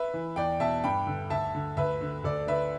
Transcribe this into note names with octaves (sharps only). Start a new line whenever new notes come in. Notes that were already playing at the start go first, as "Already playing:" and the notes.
Already playing: B4 E5
E3
E2 D5 G5
B2 E5 A5
G2 G5 B5
D3
D2 E5 A5
D3
D2 B4 E5
D3
D2 A4 D5
D3 B4 E5